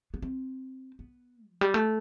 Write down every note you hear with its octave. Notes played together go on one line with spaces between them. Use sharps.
B3
C4
B3
F3
G3
A3